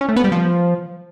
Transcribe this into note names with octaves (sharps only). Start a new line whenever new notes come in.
C#4
A3
B3
G3
F3